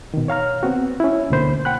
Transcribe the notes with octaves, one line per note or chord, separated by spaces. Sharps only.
B2 D#3
C#5 F5 A#5 F6
B3 C4 F#4
C#4 E4
D2 B2 D3 A#3 C5 B5
F#5 G5 B5 F#6